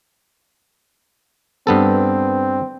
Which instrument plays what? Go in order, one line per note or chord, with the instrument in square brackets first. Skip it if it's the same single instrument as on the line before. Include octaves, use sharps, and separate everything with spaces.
[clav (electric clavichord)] G2 B3 A4 [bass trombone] C4